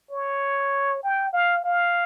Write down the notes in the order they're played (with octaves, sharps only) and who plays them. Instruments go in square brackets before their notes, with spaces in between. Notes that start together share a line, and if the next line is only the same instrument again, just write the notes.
[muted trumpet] C#5
G5
F5
F5